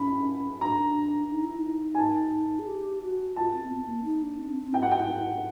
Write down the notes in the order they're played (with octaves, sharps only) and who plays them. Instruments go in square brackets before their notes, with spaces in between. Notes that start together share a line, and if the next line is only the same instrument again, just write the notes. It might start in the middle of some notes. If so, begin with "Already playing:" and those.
Already playing: [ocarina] C#4 [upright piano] B5
[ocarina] D4 [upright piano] A#5
[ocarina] D#4
E4
D#4
[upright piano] G#5
A5
[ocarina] G#4
G4
F#4
[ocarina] F4 [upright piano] A5
[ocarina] C4
C4
B3
A#3
D#4
D4
C4
C4
[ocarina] E4 [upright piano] G5
[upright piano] F#5
G5